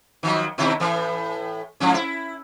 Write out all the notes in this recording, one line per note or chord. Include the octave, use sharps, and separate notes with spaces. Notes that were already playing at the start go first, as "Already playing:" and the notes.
D#3 F3 F#3
B2 D#3 E4
A2 E3
G#2 F3 C#4
E4